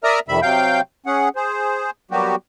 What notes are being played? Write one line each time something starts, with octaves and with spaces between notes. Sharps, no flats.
A#4 D5 E5 A#5 D#6 F6
F2 C3 D#3 G3 E5 B5
C3 F#3 F5 G5 G6
C#4 G#4 F#5
G#4 C5
F#3 G3 A#3 B3 F#4 G4